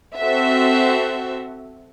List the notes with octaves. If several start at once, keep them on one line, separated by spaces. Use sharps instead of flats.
C4 F#4 A4 E5